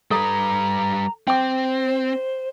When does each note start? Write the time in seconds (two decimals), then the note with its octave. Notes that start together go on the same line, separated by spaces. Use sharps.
0.11 G3 A4 B4 A#5
1.28 C4 C5 G5 D6